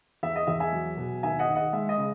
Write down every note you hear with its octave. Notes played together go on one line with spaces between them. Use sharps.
E2 E5
D#5
E2 E5
E5 G#5
F#3
B2
D#2 E5 G#5
D#5 F#5
D#2
D#5 F#5
G#3 E5
D#5
C#3